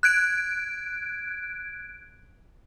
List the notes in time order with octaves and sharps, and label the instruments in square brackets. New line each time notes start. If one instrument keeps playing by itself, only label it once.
[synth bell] F#6 G#6 D7